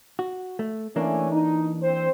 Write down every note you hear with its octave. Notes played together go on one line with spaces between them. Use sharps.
F#4
A3
E3 A3 A#3 C#4 D4
D#4
C4 C5